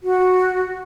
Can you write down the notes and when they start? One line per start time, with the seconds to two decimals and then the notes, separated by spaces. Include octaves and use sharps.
0.03 F#4